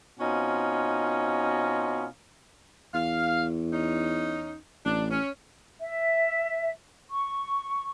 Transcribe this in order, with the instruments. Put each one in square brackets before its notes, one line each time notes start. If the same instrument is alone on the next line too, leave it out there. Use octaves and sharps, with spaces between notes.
[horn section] B2 C4 C#4 D#4 F4
[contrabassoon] E2 [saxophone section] F5
[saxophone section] C#4 D#4
[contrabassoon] A1 [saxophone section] D4
[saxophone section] C#4
[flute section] E5
C#6